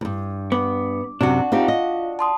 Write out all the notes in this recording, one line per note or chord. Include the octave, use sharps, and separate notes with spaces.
E2 G2
B3 D6
F#2 C3 D4 F#4
C4 D#4 F4 G4 F5
D#5
A5 C6 D#6